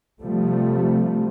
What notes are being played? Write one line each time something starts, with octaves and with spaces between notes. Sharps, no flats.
C3 F3 G3 A3